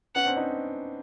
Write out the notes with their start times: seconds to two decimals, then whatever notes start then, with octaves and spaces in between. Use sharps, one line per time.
0.15 B3 C#4 F#5
0.26 C4 D4
0.37 C#4 D#4